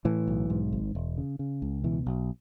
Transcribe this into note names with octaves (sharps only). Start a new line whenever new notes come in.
A2 E3
B1
G#2
G#1
E1
C#3
C#3
C#2
B2 E3
B1